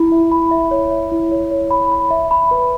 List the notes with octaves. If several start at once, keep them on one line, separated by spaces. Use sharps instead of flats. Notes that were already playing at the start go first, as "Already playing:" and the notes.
Already playing: E4 B5
E5
B5
E5
C#5
E5
E4
C#5
C#5
B5
B5
E5
B5
B4